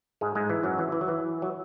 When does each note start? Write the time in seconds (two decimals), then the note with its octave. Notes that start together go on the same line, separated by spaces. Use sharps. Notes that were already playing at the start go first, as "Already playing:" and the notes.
0.21 G#2 G#3
0.35 G#2 G#3
0.50 E3
0.64 F#2 F#3
0.79 E3
0.92 E3
1.01 F#3
1.08 E3
1.42 F#3